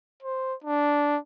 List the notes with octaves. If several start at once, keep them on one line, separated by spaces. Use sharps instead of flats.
C5
D4